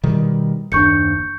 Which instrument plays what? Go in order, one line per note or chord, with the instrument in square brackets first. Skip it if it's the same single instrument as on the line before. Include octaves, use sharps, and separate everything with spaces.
[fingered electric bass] B2 D#3 G3
[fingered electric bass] F#1 D#2 D4 [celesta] C#6 G6 C#7